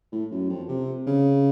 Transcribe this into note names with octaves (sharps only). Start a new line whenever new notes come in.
A2
F#2
F2
C3
C#3